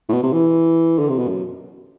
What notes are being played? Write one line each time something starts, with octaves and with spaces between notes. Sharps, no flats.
A2
B2
C3
E3
D3
C3
B2
F#2